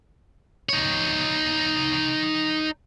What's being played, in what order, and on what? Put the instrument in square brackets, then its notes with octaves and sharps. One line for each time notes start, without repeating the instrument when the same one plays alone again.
[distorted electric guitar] D#4 C#5